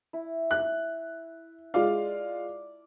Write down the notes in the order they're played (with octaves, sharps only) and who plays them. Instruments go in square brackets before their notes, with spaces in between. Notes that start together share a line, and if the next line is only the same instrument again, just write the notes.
[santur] E4
[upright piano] F#6
[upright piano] G#3 F4 F5 [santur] D5